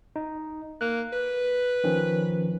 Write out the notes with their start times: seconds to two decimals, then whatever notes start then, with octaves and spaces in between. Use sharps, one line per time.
0.16 D#4
0.81 A#3 F#6
1.13 B4
1.84 D#3 F3 C#4